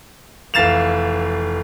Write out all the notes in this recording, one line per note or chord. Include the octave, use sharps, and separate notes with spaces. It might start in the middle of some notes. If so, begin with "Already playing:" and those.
F1 E3 F5 A6 E7 F7